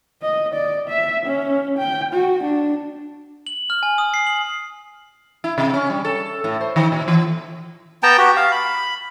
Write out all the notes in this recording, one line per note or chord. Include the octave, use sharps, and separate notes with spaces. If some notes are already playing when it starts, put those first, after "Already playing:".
D#5
D5
E5
C#4
G5
F#4
D4
F#7
F6
G#5
D#6
C7
F#7
E4
C3
C#4
G3
A4
A2
C5
D#3
A#2
E3
B3 G5 A5 A#5
F#4 G4
F5
B5